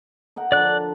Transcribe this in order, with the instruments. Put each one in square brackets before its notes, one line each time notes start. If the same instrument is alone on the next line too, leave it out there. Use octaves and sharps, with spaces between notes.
[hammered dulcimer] D#4 A#4 F#5
[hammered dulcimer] D3 F3 A4 [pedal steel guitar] D5 F#6